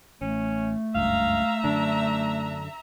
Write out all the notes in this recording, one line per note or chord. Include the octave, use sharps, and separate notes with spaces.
A1 A3 C#4
F#1 C#2 G2 E5 F5 A#5
F#2 D3 D4